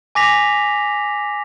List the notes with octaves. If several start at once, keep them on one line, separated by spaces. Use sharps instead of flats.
G#5 D6 A#6 B6 F7